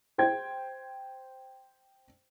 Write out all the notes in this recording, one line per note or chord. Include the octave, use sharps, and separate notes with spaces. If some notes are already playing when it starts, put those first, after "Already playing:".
C5 G5 G#6